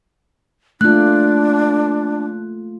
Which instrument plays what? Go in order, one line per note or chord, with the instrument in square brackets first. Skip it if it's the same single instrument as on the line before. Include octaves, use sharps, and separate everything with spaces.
[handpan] A3 A#3 F4 [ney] D4 [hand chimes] F#6